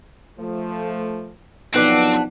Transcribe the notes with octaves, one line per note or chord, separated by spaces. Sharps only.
F3 A3
B1 G2 D#3 F3 C4 D4 B4 F#5